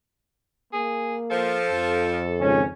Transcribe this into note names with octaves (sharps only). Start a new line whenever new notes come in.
A#3 G#4
F3 A4
F2
G#1 C#2 C#4